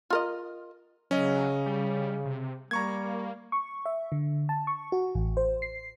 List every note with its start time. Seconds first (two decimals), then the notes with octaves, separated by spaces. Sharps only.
0.10 F4 A#4 D#5
1.11 C#3 F#3 C#4 D#5
1.66 G3
2.25 C3
2.71 G3 A#3 A#5 C#6 G#6
3.52 C#6
3.86 E5
4.12 D3
4.49 A5
4.67 C#6
4.92 F#4
5.15 A1
5.37 C5
5.62 C7